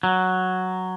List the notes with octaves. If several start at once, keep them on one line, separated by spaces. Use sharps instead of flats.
F#3